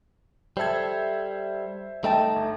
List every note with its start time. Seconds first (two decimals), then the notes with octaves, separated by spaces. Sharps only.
0.57 G3 A4 C5 E5 G#6
2.04 A3 D#4 D#5 G5 A5
2.36 G1